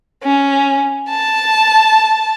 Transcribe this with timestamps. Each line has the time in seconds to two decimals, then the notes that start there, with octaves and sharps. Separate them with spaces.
0.23 C#4
1.10 A5